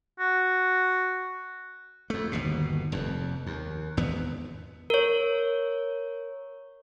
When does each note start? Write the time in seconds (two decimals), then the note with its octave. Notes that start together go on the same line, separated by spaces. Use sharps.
0.20 F#4
2.10 F2 A3
2.32 G1 D#2 B2
2.92 F1 F2
3.46 D#2
3.97 G#1 E2 B3
4.90 A#4 C#5